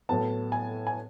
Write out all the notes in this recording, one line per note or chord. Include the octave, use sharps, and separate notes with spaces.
A2 F#3 B3 A5
G#5
G#5